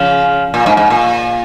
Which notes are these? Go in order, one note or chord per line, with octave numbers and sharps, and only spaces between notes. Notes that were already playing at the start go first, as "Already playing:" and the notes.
Already playing: C#3 F3
A#2
G#2
G#2
A#2